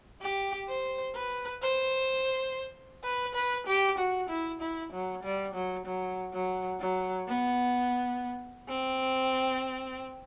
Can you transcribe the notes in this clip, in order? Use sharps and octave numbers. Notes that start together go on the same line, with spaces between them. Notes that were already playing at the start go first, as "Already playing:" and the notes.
G4
C5
B4
C5
B4
B4
G4
F#4
E4
E4
F#3
G3
F#3
F#3
F#3
F#3
B3
C4